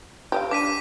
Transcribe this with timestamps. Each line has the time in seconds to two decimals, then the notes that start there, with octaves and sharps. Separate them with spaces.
0.32 G4 D#5 F5
0.51 D4 D6 B6 D#7